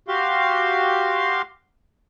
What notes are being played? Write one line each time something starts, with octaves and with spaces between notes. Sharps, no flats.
F#4 G4 F5 C6